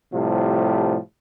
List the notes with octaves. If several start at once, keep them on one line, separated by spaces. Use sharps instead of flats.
A2 C3 F3 G3